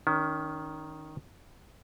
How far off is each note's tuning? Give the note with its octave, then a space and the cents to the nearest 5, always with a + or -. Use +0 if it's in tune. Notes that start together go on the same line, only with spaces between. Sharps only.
D#3 +0 C#4 +35